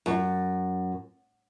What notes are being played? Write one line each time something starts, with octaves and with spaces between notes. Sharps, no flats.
F#2